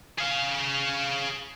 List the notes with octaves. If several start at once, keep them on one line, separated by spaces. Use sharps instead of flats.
G#4 F5